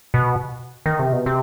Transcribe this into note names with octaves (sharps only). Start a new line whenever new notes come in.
B2
D#3
C3
B2
C3